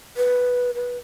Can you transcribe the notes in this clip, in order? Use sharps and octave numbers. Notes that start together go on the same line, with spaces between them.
B4
B4